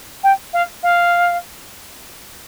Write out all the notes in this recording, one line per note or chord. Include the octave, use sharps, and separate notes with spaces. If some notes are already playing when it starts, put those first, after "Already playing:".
G5
F5
F5